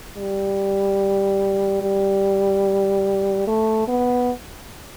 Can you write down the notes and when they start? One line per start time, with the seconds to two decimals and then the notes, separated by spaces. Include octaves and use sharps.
0.17 G3
1.82 G3
3.47 A3
3.88 B3